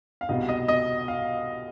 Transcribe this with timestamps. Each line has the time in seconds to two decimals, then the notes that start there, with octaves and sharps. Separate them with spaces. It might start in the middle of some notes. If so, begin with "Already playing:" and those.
0.21 F5
0.29 C2 B2 D#5
0.49 D#5
0.68 D#5
1.08 F5